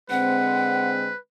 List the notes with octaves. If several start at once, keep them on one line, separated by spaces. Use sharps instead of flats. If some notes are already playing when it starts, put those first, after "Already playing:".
D3 G#3 C4 B4 F#5